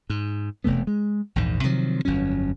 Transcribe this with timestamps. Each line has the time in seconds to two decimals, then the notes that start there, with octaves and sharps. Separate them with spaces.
0.10 G#2
0.64 E1 C3 A3 B3
0.87 G#3
1.36 A#1 E2 G#2
1.64 C3 D#3 F3 F#3
2.05 G1 F2 F#3 C#4